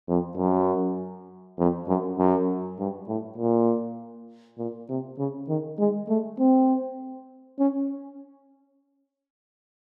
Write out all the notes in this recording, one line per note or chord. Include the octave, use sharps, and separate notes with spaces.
F2
F#2
F2
F#2
F#2
G2
A2
A#2
A#2
C3
C#3
D#3
G#3
A3
C4
C#4